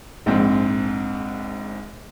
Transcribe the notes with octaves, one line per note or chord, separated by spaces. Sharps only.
A#1 G#2 C4